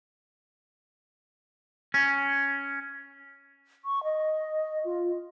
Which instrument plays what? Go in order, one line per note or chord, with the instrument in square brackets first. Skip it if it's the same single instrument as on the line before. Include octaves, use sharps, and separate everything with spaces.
[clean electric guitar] C#4
[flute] C#6
D#5
F4